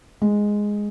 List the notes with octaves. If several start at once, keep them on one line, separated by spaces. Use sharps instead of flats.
G#3